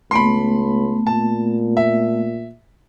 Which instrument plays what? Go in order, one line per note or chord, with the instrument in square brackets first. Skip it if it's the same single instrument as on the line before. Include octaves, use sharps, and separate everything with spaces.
[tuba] C#2 [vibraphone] A3 B3 [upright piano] B5 C6
[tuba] A#2 [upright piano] A5
[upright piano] E5